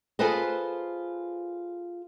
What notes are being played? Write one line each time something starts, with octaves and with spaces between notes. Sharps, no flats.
F4 G#4 A4 B4 C5 D#5